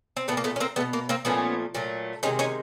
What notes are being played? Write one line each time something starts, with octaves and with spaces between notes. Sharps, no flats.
C4
G3 A3 B3
A#2
A#3
A3 B3
C#4
A#3 C4
G3 A3 B3
B2
A#3
A#3 C4
A#2 F3 A3 B3 C#4
A#2 F#3 A3
C3 D#3 G#3 C#4 D#4
C#4 D#4